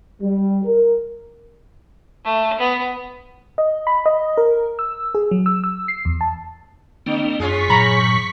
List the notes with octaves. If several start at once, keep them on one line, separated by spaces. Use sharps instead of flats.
G3
A#4
A3
B3
D#5
B5
D#5
A#4
E6
G#4
F#3
E6
E6
C7
E2
A5
D3 A#3 C4
F#2 C#4 F4 G#4 C#6 B6
G2 A#2 F#3 A#5 B5